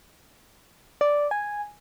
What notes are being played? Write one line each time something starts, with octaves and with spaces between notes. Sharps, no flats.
D5
G#5